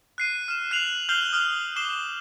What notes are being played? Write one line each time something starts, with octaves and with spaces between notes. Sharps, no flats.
F#6 C7 D#7
F6 E7
F#6 C7 F7 F#7
F6 G6 C7 F7 G7
D#6 F6 G7
D6 C7 E7 G7